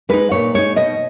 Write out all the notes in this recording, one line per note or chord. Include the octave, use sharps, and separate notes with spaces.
G#3 D#4 B4
A#2 C#5
G#3 D#4 C#5
B2 D#5